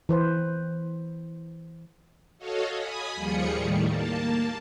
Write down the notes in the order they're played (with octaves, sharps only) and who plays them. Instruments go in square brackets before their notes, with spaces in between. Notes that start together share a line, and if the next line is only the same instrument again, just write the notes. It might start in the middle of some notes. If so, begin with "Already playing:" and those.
[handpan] E3 B4 C5
[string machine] F#4 A4 C#5 D#5 F5
G#5 B5 D#6
D#2 F3 G3 F4 G#4 C#7
A2 D#3 G3
A#3 A5